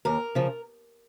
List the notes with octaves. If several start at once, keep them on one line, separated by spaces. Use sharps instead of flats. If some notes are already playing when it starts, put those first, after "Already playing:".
D#2 A#4
C#3 F3